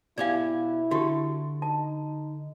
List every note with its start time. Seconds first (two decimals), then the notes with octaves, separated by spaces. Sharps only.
0.18 B2 E4 G4 D5 F5 G#5
0.91 D3 F#4 G4
1.62 D#4 A5